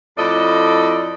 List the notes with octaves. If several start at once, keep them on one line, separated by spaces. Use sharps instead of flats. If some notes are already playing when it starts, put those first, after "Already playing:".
F2 A2 F3 A4 D5 D#5